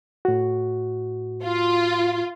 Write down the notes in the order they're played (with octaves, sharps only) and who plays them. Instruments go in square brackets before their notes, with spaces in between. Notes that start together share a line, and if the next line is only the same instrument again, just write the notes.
[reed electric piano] A2 F#4
[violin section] F4